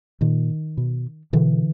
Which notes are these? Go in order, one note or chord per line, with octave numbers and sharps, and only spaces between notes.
A#2 D#3
B2
B2 D3 E3